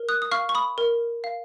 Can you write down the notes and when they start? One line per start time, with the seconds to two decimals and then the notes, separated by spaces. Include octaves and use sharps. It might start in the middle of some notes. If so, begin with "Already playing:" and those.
Already playing: A#4
0.09 D#6 F#6
0.22 D#6
0.31 F5 C#6 F6
0.49 C#6
0.55 B5 D#6
0.78 A#4
1.24 F5